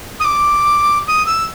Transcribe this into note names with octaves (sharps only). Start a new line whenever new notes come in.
D#6
D6
D#6
E6